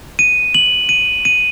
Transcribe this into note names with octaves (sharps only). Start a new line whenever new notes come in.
D#7
F#7
D#7
D#7